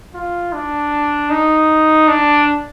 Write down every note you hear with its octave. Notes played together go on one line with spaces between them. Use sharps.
F4
D4
D#4
D4